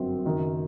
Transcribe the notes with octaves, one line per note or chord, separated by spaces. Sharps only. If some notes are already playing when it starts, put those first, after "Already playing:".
Already playing: G1 F#2 F#3 C4
F#1 F#2 D#3